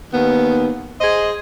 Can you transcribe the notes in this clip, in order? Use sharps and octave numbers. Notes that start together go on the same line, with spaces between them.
D#2 D#3 B3
G#4 C5 D#5